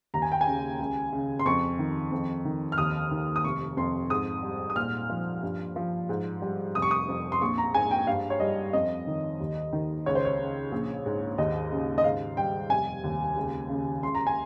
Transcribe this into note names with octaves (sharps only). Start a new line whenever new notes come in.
D#2 A#5
G#5
G5
G#5
C#3
C#2
C#3
C6
F2 C#6
D#3
F2
D#3
F6
D#2 D#6
D#3
D#6
F1 C#6
F2 C6
G#2 D#6
G3
D#6
A#2 F6
F3
G2
F3
G#2
G3
F1 D#6
C#6
D#6
F2
C6
A#1 C#6
A#5
G#2 G#5
G5
G2 F5
C#5
G3 D#5
F2 D#5
D#3
D#2
D#3
C#2 C#5
C5
C#5
C#3
A#1
G#2
D#2 D#5
C#3
D#5
G#2 F5
G3 G5
F1 G#5
D#2
C#2
C#3
C#2 C6
A#5
G#5